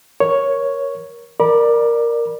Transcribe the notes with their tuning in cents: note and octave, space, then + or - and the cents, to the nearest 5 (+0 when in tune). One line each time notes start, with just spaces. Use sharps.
A#4 +15 C#5 +0
A#4 +0 D5 +15 B5 -35